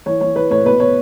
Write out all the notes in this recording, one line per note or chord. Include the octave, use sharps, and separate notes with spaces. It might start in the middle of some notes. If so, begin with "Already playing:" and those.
E3 C#5
E3 C#5
E3 B4
A2 C#5
B2 B4
B2 C#5